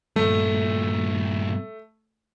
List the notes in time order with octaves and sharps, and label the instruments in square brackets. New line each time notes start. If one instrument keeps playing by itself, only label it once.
[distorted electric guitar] G2 A#2 [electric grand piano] A3